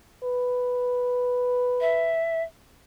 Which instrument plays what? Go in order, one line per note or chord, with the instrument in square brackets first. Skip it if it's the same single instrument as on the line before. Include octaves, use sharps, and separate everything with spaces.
[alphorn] B4
[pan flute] E5